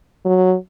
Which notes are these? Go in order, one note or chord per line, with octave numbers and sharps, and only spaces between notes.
F#3